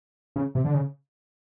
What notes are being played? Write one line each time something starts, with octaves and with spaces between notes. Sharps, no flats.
C#3
C3
D3
C#3